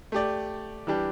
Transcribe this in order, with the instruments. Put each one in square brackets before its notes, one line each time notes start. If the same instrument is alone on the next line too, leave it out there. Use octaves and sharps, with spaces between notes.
[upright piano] A3 G4 D5
E3 G3 D4 G4